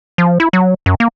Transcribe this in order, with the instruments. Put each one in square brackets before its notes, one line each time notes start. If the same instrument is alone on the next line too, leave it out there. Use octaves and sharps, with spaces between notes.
[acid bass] F3
E4
F#3
F#2
A#3